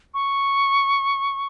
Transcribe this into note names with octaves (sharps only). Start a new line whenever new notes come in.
C#6